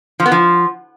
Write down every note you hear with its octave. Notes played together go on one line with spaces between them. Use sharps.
F3
B3
F3